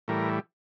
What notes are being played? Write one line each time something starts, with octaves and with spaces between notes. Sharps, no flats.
A2 E3 G3 A#4